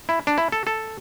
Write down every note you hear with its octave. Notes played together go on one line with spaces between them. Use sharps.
E4
D4
E4
A4
A4